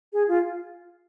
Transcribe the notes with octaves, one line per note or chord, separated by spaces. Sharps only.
G#4
F4